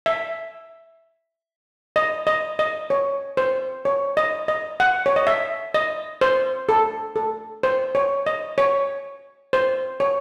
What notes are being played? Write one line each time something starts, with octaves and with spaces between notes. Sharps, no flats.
E5
D#5
D#5
D#5
C#5
C5
C#5
D#5
D#5
F#5
C#5
D#5
E5
D#5
C5
A4
A4
C5
C#5
D#5
C#5
C5
C#5